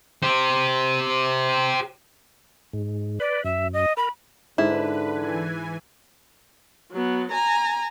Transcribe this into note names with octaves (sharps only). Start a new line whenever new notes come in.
G4 C5
G#2
B4 D5
F#2 E5
D#5
A#4 B5
G#2 D3 E4 B4
E3 G#5
F#3 B3
G#5 A#5